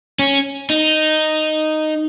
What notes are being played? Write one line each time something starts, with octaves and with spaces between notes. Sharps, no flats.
C#4
D#4